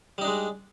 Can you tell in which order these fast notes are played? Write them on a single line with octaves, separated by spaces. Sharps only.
G3 D#4 D4 G#3